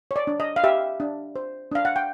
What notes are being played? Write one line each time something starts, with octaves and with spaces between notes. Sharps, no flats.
C#5
D5
D4
D#5
F5
G4 E5
D4
C5
D4 F5
F#5
G5